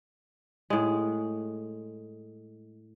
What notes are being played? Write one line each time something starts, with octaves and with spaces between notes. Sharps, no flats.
A2 G#3